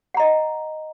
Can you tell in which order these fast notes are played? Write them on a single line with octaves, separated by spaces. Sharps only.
F#5 A#5 D#5